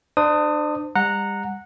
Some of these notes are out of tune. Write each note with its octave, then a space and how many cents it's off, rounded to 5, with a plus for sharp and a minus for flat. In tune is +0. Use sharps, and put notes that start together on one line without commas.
D4 +30 C5 -25 D#6 +0
G3 +30 F#5 -10 A#5 -10